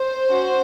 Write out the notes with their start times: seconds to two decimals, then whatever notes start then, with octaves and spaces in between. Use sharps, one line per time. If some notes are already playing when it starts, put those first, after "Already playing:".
Already playing: C5
0.27 C#4 F#4